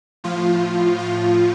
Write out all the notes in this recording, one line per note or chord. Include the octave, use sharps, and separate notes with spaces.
A2 F3 F4
F4